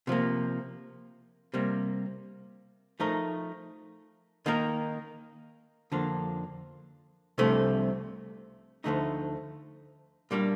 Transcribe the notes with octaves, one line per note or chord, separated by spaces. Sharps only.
C3 F3 A#3
C3 G3 A#3
F3 A3 D#4 A#4
D#3 A#3 D#4 A#4
F2 D3 F3 A#3 D4
C2 C3 F3 A3 D4
D2 D3 F3 A3 D#4
A#2 G3 A#3 D4